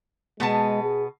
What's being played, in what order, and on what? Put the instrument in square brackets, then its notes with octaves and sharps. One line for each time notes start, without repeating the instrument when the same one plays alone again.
[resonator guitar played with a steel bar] B2 B3 A5 [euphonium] G#3
[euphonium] G#4